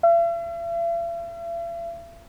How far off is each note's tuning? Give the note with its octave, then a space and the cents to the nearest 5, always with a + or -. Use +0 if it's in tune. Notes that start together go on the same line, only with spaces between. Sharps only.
E5 +45